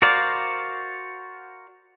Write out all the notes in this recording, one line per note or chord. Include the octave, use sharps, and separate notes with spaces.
F#4 A#4 C5 D5 F5